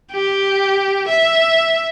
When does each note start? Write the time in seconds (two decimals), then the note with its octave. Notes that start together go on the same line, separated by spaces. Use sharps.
0.12 G4
1.08 E5